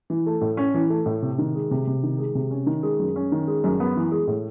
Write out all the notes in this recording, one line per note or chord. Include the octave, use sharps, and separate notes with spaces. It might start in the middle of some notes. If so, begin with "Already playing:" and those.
E3
A3
A2
C#4
E3
A3
A2
C3
D#3
G#3
C3
C3
D#3
G#3
C3
C#4
D#3
G#3
F#2
C#4
D#3
G#3
F#2
B3
E3
G#3
A2